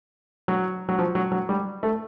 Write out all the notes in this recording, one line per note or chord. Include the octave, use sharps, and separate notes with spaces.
F#3
F#3
F3
F#3
F#3
G3
A3